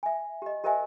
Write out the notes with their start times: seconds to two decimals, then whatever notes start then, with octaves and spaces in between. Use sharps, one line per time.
0.03 E5 G#5
0.42 G4 D#5
0.64 G4 A#4 C5 D#5 E5 G#5